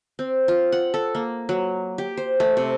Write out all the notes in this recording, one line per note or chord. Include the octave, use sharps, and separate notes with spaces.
C4
F4
F#5
A4
A#3
F#3
G4
C5
A3
C3